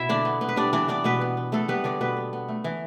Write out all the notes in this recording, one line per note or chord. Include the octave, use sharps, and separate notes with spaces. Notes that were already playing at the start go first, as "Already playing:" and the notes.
Already playing: B2 E4 E5
D3 D4 D5
B3
B3
B4
G3 D4 D5
E3 D4 D5
B3 D4 D5
B2 B3 B4
B3
B3
A3 B3 A4
G3 B3 B4
D3 D4 D5
B2 B3 B4
B3
B3
A3
E3